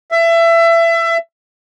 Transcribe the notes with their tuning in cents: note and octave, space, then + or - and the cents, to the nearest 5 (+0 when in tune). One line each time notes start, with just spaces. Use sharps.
E5 +25